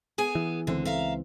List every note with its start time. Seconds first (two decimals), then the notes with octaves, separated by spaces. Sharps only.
0.18 B3 G#4 G#5
0.35 E3
0.67 C#2 D3 E3 C4
0.85 E5 F5 A#5